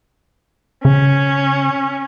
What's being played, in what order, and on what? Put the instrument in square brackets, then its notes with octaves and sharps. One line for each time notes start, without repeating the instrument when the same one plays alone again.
[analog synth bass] C#3 [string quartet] C#4